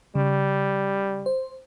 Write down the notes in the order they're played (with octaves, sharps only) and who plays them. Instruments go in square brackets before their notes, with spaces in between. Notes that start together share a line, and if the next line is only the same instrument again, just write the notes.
[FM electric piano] C#3 [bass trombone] G3
[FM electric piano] C5